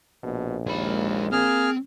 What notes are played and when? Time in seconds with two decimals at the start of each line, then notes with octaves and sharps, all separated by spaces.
0.23 A#1 B2
0.67 D#2 G#3 B5
1.32 A#3 C4 G#4 F6